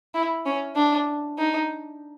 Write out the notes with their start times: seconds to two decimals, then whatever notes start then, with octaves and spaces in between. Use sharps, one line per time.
0.14 E4
0.46 C#4
0.76 D4
1.38 D#4